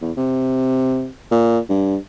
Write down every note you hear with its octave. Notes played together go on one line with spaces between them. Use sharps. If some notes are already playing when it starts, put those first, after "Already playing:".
E2
C3
A#2
G2